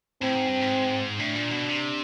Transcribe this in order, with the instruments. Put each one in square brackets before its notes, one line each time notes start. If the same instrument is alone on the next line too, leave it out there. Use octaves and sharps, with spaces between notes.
[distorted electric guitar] A2 [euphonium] C4
[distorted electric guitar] G#2
G2
G#2
[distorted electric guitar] A2 [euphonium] D4
[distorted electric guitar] A#2
B2
C3